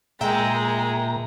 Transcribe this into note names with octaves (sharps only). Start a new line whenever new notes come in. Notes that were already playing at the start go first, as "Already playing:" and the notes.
A#2 G#3 E5 G5 A#5